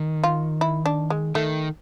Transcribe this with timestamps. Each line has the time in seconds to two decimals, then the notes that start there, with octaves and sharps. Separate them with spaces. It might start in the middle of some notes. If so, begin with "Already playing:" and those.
Already playing: D#3
0.24 F4
0.61 E4
0.86 D4
1.10 G#3
1.35 D#3 A3